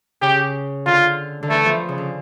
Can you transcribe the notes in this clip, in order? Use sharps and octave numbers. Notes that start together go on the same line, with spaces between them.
C#3 G4
D3 F4
D3
E3 A3
F3
C#3
D3